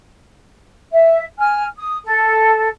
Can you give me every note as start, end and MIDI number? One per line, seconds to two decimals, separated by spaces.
0.92 1.24 76
1.38 1.65 80
1.38 1.65 89
1.77 1.97 87
2.04 2.68 69